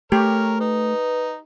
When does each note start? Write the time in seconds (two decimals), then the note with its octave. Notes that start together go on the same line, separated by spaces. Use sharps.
0.12 A3 G4 A#4 C#5
0.61 D#4 B4